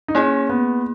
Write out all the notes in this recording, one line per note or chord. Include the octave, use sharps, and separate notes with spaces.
D#4
A#3 C#4 E4 G#4
B3